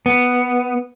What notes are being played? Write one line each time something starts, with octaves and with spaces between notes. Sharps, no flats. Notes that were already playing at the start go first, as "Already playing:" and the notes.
B3